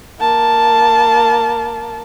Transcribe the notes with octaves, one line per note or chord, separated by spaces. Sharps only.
A#3 A5